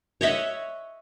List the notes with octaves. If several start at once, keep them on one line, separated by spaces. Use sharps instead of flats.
C#5 D#5 E5 F#5